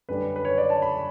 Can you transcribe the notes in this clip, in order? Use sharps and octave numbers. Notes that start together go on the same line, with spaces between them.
F#2 D3 G3 B4
B4
C#5
D5
A5
B5